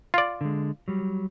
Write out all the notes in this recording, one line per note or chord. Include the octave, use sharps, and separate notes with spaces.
F4 D5
D3 G#3
F#3 G3